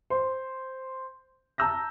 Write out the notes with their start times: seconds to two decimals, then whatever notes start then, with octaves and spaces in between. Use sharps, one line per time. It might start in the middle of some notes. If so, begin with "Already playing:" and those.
0.10 C5
1.58 A5 A#5 E6 G6 A#6